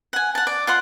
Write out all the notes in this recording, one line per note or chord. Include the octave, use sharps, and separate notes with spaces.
F#5 G#5
F#5 A5
D5
F4 F#5 C6